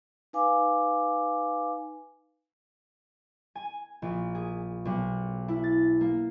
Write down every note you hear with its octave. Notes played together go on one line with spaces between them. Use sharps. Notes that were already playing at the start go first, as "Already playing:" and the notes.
D#4 B4 F5 G#5 D6
G#5
A#1
G#4
B1
E4
A6
A#3